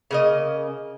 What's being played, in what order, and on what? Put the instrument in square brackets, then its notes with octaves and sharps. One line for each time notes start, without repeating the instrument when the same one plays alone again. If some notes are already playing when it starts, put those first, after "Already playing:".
[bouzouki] C#3 A#3 D#5